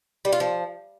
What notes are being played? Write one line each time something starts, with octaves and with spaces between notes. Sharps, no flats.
G3
F4
F3